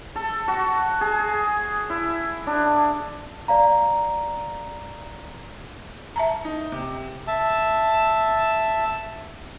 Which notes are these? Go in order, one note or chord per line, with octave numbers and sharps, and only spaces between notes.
A4
F#4
G#4
E4
D4
D5 F5 A#5
E5 A5 A#5
D#4
C3
E5 A5